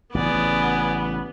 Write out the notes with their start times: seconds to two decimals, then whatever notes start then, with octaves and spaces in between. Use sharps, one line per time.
0.15 A1 C#3 B3 G#4 D5